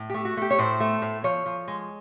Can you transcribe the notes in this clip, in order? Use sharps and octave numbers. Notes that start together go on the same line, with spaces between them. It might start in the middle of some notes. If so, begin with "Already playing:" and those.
Already playing: A2
A3 G4
F#4
A3 G4
C#5
A2 C5
A3
A2
F3 C#5
F3
G#3